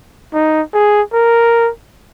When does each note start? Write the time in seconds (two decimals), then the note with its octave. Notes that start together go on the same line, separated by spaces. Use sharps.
0.33 D#4
0.73 G#4
1.13 A#4